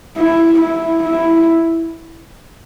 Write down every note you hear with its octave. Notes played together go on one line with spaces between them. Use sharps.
E4
E4
E4